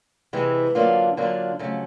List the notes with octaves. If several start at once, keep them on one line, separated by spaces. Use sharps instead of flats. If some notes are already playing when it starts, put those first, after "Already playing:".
C3 E3 G#3 C4 E4
D3 F#3 A#3 D4 F4
D3 F#3 A#3 D4 F4
F2 C#3 F#3 A3